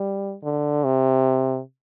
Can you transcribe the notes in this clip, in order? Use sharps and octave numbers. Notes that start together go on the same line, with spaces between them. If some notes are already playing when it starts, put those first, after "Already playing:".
Already playing: G3
D3
C3